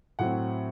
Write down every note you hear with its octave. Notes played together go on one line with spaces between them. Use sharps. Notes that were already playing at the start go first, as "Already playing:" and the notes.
A2 F#3 C4 F#5